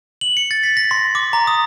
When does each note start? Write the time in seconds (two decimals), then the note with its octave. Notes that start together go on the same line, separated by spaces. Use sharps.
0.21 F#7
0.37 C#7
0.51 A6
0.63 B6
0.77 A#6
0.91 C6
1.15 D6
1.33 A#5
1.47 D#6